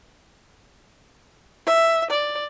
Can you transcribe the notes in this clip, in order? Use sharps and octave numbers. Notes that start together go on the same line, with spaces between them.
E5
D5